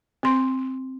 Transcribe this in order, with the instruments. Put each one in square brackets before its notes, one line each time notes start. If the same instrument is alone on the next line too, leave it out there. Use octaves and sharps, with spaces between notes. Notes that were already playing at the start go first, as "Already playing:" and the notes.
[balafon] C4 C6